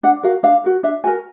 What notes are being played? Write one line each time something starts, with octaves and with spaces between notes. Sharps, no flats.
D4 F#5
F#4 A#4 F5
D4 F5
F#4 A#4
D4 E5
F#4 A#4 G#5